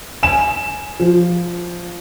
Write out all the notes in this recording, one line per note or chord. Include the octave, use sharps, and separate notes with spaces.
G#5 E7
F3